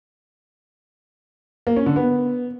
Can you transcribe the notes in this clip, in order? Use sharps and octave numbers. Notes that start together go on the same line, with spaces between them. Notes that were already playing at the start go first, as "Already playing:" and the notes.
A#3
C#4
D3
B3